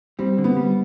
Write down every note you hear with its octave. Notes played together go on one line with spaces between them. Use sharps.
G3 C4
D3
B3
G3